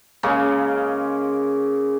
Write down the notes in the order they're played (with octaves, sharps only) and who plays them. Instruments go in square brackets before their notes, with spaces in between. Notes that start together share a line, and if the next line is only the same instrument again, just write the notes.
[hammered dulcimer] C#3 G#3 A#3 C#4